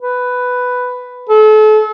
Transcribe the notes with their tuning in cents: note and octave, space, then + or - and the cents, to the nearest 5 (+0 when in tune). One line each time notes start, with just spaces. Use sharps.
B4 +5
A4 -35